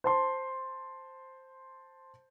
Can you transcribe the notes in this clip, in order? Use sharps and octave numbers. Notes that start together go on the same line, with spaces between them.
C5 A5 C6